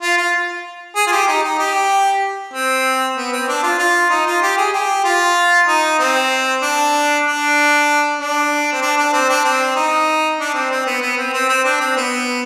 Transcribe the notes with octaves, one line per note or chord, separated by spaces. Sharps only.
F4
F4
G#4
F4
G4
D#4
D#4
G4
C4
B3
C4
D4
F4
F4
D#4
F4
G4
G#4
G4
F4
D#4
C4
D4
D4
D4
C4
D4
D4
C4
D4
C4
D#4
D4
C4
C4
B3
B3
C4
C4
C4
D4
C4
B3